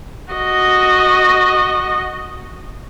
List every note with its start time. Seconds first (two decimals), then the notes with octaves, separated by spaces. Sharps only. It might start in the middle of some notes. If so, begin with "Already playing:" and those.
0.32 F#4 D#5